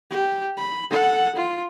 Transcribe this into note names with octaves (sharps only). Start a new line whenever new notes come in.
G4
B5
A4 F#5
F4